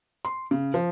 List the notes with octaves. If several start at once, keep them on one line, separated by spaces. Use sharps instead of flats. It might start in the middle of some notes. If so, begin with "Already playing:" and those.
C6
C#3
F3